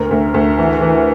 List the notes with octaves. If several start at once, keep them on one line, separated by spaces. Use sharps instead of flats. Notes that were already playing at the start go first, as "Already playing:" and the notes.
Already playing: D2 A#4
D2
D2
E3
E3